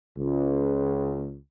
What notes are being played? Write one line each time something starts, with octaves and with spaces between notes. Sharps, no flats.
C#2